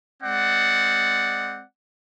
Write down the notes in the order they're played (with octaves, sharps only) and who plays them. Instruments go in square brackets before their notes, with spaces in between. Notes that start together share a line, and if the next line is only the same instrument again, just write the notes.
[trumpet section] G#3 C4 D5 F#5